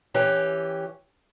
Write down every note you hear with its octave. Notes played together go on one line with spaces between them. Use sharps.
E3 C#4 G4